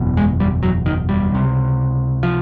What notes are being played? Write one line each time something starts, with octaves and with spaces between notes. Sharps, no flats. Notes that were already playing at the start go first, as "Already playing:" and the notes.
Already playing: F#1 E2 B2
G#3
G3
F#3
D#3
G3
C#2 C3
F3